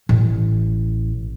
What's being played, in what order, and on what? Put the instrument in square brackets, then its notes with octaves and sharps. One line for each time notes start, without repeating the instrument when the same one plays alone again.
[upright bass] A1